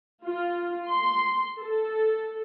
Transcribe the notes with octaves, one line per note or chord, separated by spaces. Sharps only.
F4
C6
A4